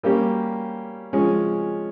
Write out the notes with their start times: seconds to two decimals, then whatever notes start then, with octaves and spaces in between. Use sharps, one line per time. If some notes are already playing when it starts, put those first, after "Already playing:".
0.03 G3 A#3 C#4 G4
1.13 F3 G#3 C#4